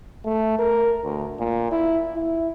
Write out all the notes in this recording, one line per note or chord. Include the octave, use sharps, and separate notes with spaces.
A3
A#4
D2
A#2
E4
E4